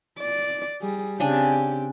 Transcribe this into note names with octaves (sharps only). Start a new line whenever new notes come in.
D5
G3 G#4
C#3 C4 D4 G4 G#5